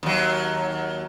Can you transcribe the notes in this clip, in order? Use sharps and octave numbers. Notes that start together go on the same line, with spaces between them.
D#2 F#3